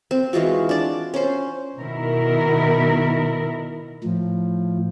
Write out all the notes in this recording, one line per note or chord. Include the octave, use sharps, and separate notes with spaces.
C4
E3 G#3 F4 F#4
D4 D5
C#4 C5
B2 D#3 E4 A#4
A2 F3